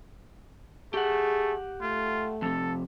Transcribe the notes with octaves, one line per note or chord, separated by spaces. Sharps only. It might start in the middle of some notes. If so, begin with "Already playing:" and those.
A3 G4 G#4 F#5
A3 F4
F2 C3 A4